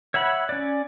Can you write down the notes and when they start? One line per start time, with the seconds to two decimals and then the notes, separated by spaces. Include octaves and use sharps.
0.14 C#5 E5 F#5 B5
0.49 C#4 D5